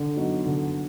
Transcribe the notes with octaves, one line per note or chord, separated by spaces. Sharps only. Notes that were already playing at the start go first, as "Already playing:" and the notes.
Already playing: D3
F#3 B3 D#4 F#4
D3